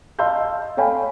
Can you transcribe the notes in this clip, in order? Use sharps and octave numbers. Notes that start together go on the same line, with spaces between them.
D#5 F5 A5 C6 E6 G6
A4 C#5 F5 G5 G#5 B5